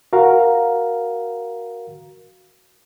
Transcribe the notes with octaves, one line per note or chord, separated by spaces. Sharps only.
F#4 A#4 F5 A#5